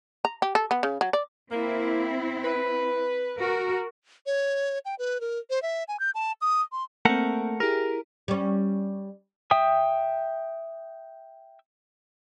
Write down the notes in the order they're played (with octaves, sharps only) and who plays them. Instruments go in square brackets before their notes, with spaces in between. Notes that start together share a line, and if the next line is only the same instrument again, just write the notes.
[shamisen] A#5
G4
A4
B3
C#3
F#3
D5
[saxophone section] A#3 [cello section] C4 E4
[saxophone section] B4
[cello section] F#4 A#4
[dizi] C#5
G5
B4
A#4
C5
E5
G#5
G6
A5
D#6
C6
[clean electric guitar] A3 A#4 F#5 [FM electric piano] A#3 C4
[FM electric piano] E4 G4 G#4 [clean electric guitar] A#4
[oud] G3 C#4
[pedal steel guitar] E5 G5 D#6